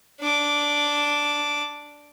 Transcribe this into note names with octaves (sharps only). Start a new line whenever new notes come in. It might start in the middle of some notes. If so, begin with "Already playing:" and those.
D4 D6